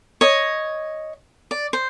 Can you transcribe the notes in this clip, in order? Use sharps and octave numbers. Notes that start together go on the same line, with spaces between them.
C#5 D#5
D5
C5